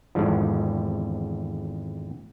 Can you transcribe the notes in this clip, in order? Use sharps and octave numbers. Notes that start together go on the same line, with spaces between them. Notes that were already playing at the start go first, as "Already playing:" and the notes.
G#1 E2 G#2 D3 F3